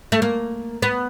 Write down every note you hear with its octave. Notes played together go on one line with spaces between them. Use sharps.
A3
A#3
B3